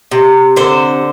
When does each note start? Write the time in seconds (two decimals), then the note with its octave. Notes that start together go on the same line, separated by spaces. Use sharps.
0.11 C3
0.57 D3 C5